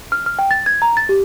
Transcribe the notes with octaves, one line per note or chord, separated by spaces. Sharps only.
F6
F6
G5
A6
G#6
A#5
A6
G4